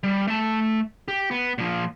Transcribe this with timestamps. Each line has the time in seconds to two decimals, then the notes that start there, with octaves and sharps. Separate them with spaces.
0.03 G3
0.27 A3 A5
1.08 G4
1.31 B3
1.58 A#2 F3